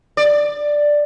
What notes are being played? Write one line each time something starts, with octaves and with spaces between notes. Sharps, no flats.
D5